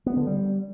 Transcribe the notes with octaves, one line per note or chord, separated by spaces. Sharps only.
B3
D3
G3